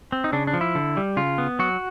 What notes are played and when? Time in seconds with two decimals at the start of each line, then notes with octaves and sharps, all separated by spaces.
0.12 C4
0.24 D#4
0.33 C#3 D4
0.47 D4
0.54 F3
0.61 E4
0.75 D3
0.97 G3
1.17 C#3 F4
1.38 B3
1.59 F#3 F#4